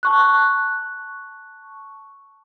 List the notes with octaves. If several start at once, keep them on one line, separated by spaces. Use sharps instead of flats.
A5 C#6 F#6